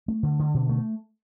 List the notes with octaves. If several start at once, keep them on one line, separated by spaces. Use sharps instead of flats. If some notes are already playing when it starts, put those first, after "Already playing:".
A3
D3
D3
B2
A3